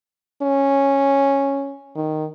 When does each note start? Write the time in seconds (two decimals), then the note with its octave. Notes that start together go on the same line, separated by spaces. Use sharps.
0.42 C#4
1.95 D#3